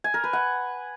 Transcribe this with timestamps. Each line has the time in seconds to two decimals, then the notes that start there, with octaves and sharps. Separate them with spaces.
0.04 G#5
0.14 A#4
0.24 B4
0.33 F#5